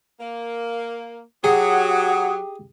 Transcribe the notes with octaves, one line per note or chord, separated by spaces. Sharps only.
A#3
F#3 G4 G#4 F#5 D#6